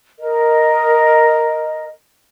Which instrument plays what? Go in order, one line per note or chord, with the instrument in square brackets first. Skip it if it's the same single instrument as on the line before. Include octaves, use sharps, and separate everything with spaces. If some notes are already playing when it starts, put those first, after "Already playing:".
[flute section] A#4 D#5